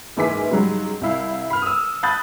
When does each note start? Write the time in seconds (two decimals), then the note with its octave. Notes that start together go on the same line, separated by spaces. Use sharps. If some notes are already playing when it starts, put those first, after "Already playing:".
0.17 F#1 G#2 E3 G#5 D6 B6
0.51 G#2 C#3 F#3 G3
1.01 C2 E4 F5
1.50 B5 F6
1.62 D#6 E6
2.03 A5 B5 D#6 F#6 G6 A6